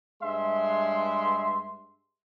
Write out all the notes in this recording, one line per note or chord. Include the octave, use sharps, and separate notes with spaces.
G2 G#3 E5 C6